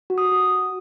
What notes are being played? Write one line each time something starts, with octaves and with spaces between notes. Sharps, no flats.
F#4
D#6
F#4